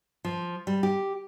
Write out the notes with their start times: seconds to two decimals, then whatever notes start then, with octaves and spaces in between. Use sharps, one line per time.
0.24 F3
0.67 G3
0.83 G4